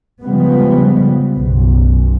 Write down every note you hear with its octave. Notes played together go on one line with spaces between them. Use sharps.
C#3 F3 G3 G#3 B3
B1 F#2